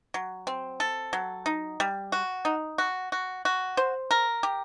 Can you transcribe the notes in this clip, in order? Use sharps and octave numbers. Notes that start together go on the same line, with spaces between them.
F#3
C4
A4
F#3
D#4
G3
F#4
D#4
F#4
F#4
F#4
C5
A#4
G4